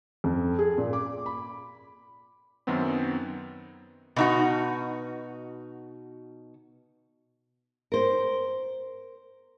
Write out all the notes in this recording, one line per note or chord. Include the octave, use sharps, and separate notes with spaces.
F2
G#4
A#2
D6
B5
F#2 D#3 F#3 B3 C4
B2 D#4 F#4
A#4 C5